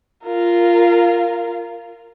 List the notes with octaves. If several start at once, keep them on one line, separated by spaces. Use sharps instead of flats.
F4 A#4